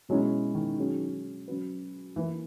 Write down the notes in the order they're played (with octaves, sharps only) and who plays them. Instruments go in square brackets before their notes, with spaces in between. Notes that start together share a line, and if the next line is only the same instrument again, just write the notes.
[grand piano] B2 G#3 C#4 E4 [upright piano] F#3
[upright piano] D#3
[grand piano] F#3 C#4 G#4
F#3 C#4 F#4 B4
[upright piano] E3 [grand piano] A#3 E4 B4